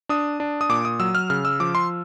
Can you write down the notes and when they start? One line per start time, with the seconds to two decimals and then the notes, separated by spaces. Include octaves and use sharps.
0.09 D4 D#6
0.40 D4
0.61 D#6
0.69 A#2 D6
0.85 D#6
1.00 F#3 E6
1.15 F6
1.30 C#3 F6
1.45 E6
1.60 F3 D6
1.75 C6